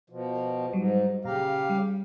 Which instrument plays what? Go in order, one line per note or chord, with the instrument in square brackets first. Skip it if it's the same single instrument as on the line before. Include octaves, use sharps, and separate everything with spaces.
[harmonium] B2 F3
[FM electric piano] A#4
[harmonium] G#2 [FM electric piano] F#3 G3
[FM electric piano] A#2 A#5 [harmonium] C#3 G4 F5
[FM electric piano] G3